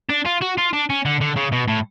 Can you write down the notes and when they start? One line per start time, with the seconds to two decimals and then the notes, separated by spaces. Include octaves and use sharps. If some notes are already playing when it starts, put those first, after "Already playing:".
0.10 D4
0.26 F4
0.42 F#4
0.58 F4
0.73 D4
0.90 C#4
1.05 D3
1.21 D3
1.36 C#3
1.52 B2
1.68 A2